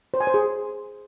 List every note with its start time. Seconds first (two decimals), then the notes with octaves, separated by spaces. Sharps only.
0.14 C5
0.20 G#5
0.27 C5
0.34 G#4